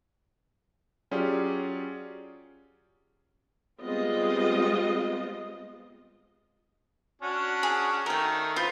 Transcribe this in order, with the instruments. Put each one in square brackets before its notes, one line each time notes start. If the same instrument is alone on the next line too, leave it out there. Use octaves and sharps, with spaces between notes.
[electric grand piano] F#3 C#4 F4 G4 G#4 D5
[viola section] G3 G#3 B3 C4 F4 D#5
[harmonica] C#4 D4 F#4
[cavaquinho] G#4
[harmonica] D#3 A3 [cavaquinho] A#4 G5
[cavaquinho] F4 [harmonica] B4 C5